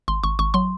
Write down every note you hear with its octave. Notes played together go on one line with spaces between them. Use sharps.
G#1 C6
G#1 C#6
G#1 C#6
F#3 C6